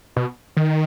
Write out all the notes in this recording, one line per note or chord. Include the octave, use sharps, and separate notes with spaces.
B2
D#3